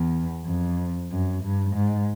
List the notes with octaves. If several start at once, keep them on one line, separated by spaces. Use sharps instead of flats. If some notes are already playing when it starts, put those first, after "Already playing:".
Already playing: E2
F2
F#2
G2
G#2